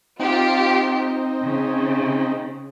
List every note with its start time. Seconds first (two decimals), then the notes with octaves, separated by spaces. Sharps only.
0.20 C4 D#4 F4 G4
1.42 C#3